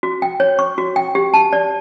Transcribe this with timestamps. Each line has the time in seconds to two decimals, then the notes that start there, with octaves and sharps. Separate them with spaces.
0.03 F#4
0.22 G5
0.40 C#5
0.59 C#6
0.78 F#4
0.96 G5
1.15 G4
1.34 A5
1.53 D5